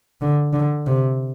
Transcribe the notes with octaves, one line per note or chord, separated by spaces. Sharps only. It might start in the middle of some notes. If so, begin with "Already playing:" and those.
D3
D3
C3